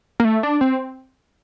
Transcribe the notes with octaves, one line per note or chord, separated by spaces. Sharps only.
A#3
A3
D4
C4